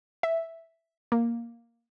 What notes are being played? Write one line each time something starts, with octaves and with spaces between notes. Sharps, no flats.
E5
A#3